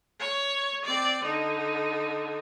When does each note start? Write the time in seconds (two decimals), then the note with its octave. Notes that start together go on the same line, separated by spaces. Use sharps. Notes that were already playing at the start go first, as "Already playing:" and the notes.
0.20 C#5
0.85 C4 D5
1.24 D3 D#4